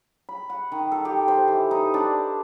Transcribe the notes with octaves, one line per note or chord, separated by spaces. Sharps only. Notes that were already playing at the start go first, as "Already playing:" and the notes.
B5
F#5
D#3
A4
G4
C5
E3
D#4
D4